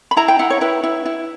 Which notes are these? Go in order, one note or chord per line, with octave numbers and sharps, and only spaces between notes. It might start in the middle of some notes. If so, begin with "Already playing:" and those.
B5
E4 A#5
G5
E4 F#5
C#5
E4 B4
E4
E4